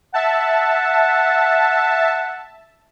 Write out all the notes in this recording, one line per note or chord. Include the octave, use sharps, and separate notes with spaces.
E5 F#5 A5